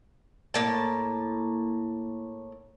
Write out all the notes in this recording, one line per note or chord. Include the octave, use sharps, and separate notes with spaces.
A2 A#3 A5